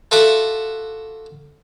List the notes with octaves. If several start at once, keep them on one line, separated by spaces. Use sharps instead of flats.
F4 F#4 A4 E5 F#5 D6